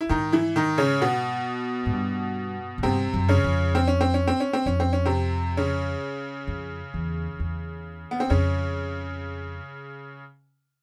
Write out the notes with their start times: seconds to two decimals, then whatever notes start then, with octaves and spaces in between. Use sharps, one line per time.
0.01 E4
0.09 G#2 D#3 D#4
0.32 E3 E4
0.56 D#3 D#4
0.78 C#3 C#4
1.02 B2 B3
1.86 G#2
1.92 G2
2.78 F#2
2.83 G2 C3 C4
3.14 F#2
3.29 C#3 C#4
3.44 F2
3.75 C4
3.87 C#4
4.01 C4
4.14 C#4
4.27 C4
4.40 C#4
4.53 C4
4.66 F2 C#4
4.80 C4
4.93 C#4
5.05 C3 C4
5.57 C#3 C#4
6.47 F2
6.94 E2
7.39 E2
8.11 B3
8.20 C4
8.30 F2 C#3 C#4